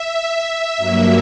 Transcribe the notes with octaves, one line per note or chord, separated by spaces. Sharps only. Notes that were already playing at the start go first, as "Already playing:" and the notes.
Already playing: E5
G2 F#3 A#3